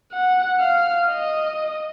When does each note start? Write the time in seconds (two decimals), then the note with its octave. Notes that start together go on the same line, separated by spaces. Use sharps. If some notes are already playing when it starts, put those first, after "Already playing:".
0.12 F#5
0.59 F5
1.07 D#5